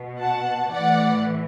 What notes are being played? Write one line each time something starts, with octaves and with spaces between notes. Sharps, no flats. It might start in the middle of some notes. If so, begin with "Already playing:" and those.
Already playing: B2
F#5 A5
A2 E3 D5 F#5